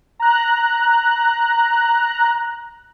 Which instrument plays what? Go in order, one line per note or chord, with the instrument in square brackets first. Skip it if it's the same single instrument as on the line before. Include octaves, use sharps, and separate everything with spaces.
[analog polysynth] A#5 F#6